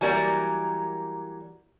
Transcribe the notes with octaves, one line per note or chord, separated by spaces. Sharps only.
E3 F#3 G3 A#3 A#4 D5